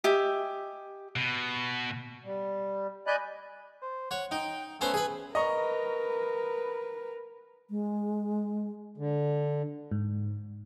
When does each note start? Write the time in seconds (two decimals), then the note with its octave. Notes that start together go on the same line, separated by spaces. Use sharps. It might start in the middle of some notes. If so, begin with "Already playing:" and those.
0.04 G4 D#5 E5 G#5
1.16 B2
2.23 G3
3.07 D5 D#5 G#5 B5 F#6 G6
3.82 C5
4.11 C#5 F#5
4.31 D#4 G5
4.81 A3 B3 C#4 C5
4.94 G#4 B4
5.35 A#4 B4 D#5 A#5 C#6
7.70 G#3
8.98 D3
9.91 G#2